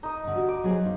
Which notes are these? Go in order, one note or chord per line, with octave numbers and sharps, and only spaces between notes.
D#4 D#6
G2 D3
F#4
D6
F#3 G#4 C5
F3 D#4